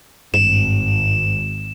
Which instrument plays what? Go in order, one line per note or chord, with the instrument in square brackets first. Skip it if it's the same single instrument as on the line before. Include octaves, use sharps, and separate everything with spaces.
[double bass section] G#1 [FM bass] G2 [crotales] E7